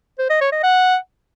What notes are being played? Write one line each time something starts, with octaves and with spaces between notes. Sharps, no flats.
C5
D#5
C#5
D#5
F#5